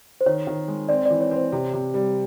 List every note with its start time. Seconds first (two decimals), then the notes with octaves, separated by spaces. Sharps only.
0.21 C5
0.26 D#3 C#5
0.47 D#3
0.68 G#3
0.89 C4 D5
1.06 E3 D5
1.21 C#5
1.31 C4 C5
1.52 C3
1.73 C3
1.94 G3